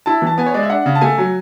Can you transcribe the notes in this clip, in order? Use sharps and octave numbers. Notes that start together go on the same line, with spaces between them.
E4 A5
E3 A5
B3 G#5
C#5
G#3 D5
E5
D4 F#5
C#3
A5
A3 G#5
F#3